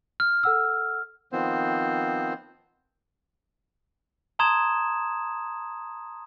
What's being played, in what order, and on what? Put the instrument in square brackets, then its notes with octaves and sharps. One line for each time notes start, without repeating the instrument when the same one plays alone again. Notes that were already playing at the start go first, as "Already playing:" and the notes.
[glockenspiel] F6
[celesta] A4 F#5 E6
[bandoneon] D#3 F3 B3 C4 C5
[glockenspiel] A5 A#5 C6 D#6 G#6 E7